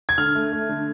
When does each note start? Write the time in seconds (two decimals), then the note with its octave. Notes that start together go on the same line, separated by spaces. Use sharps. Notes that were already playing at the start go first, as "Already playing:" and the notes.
0.09 G#6
0.18 D3 F6
0.35 A3
0.52 A3
0.69 D3